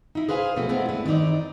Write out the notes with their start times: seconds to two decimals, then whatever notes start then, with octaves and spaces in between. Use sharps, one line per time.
0.15 D#4 E4
0.29 G#4 B4 C5 F5 G#5
0.56 B2 F3 A3 C4 E4
0.69 G#3 A3 B3 C4 E4 G#4
0.89 D3 A3 E4 B4
1.06 D#3 E3 C4 D#4 D5